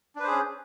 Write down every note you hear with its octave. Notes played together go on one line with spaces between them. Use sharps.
C#4 D4 G#4 B4 C5